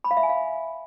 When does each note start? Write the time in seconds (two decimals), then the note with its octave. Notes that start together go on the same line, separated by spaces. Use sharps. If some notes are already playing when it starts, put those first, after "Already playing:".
0.04 B5
0.11 F5
0.17 E5
0.23 G#5
0.29 F5